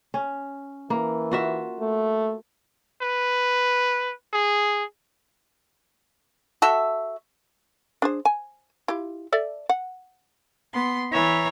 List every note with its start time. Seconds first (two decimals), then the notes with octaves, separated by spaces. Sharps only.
0.14 C#4
0.90 E3 A#3
1.32 F4 F#4 E5
1.79 A3
3.02 B4
4.33 G#4
6.62 F#4 A4 E5
8.02 D4 G#4 C5
8.25 G#5
8.88 E4 F4 G4
9.32 A4 D5 E5
9.69 F#5
10.73 B3 C6
11.11 E3 C#5 A#5